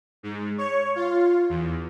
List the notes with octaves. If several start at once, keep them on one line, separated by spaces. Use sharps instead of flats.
G#2
C#5
F4
E2